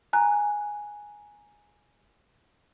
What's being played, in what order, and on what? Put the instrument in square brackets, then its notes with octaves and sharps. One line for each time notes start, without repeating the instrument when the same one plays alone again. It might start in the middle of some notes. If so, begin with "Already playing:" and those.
[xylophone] G#5 A#5 F#6